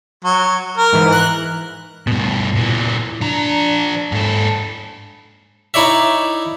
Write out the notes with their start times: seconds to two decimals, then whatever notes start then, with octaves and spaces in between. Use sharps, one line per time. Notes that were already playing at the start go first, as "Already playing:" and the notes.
0.24 F#3
0.77 A#4
0.93 G#2 E3
1.12 F#6
2.07 G2 B2
2.56 A#2 E3
3.22 F3 D4 A#5
4.12 G#2 A4
5.74 D#4 E4 C#5 D5 E5